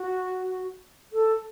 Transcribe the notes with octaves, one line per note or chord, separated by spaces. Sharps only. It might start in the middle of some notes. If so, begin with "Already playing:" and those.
Already playing: F#4
A4